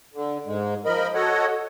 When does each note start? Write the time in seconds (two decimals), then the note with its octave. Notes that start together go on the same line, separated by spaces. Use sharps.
0.14 D3
0.47 G#2 G#3
0.85 F3 A#4 D#5 B5
1.15 F#4 A4 C#5 D#5 F#5